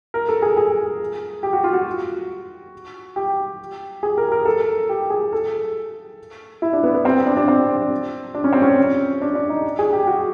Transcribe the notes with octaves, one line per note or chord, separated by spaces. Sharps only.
A#4
A4
G#4
G#4
G4
F#4
F4
F#4
G4
G#4
A#4
A#4
A4
G4
G#4
A4
E4
D4
B3
B3
C4
D4
D4
C4
D4
C#4
C4
C#4
D4
D4
D#4
G#4
G4
F#4